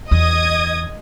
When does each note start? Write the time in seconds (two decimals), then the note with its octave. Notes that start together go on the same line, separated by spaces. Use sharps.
0.11 E2 D#5 D#6 G#6